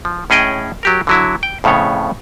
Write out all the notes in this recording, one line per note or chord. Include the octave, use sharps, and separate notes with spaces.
F3
A2 C#4 G#4 D#5 G5
F#3 G4 A#4
D3 F#3 E4
G5
F2 A2 C#3 B3 C#5